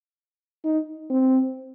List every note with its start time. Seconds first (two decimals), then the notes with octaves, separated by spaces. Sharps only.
0.64 D#4
1.10 C4